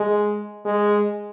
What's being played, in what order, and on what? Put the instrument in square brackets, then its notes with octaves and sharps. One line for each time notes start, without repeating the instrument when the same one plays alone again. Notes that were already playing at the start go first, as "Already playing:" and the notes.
Already playing: [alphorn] G#3
G#3